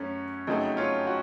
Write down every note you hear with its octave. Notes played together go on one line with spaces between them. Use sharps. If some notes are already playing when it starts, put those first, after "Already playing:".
Already playing: F#2 A3 C#4
F2 C#3 F#3 A3 D#4
C#4 F4
F#4